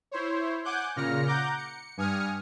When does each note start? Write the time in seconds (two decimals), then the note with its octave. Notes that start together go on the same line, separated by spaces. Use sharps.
0.11 E4 C5 C#5
0.64 F#5 G#5 D6 F#6 G6
0.96 A#2 C#3 F6 A#6 C#7
1.27 F#5 A#5 D6 G6
1.57 C#7
1.97 G2 G#5 D#6 F6 C#7